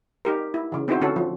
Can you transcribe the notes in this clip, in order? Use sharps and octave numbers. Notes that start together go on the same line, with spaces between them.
D#4 G4 A#4
E4
C#3 E3
B3 C4 D#4 E4 F#4 C5
D3 C#4 F#4 A4
F3